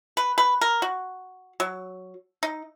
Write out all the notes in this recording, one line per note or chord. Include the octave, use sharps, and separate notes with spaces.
B4
B4
A#4
F#4
F#3
D#4